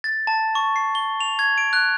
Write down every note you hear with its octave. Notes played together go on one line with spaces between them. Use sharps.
A6
A5
C#6
C7
G7
F7
G#6
D7
F#6